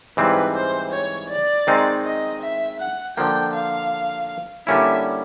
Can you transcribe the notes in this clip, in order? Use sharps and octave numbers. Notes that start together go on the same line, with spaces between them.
G#2 E3 G3 C4 B4
C5
C#5
D5
D#3 G#3 C4 D#4
D#5
E5
F#5
D3 F3 A#3 G5
F5
D3 G3 A#3 C#4 E4 E5